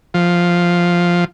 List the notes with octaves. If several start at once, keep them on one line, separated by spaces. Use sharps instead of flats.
F3